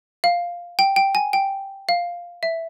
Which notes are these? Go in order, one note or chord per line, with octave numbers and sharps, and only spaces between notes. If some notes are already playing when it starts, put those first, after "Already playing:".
F5
G5
G5
G#5
G5
F5
E5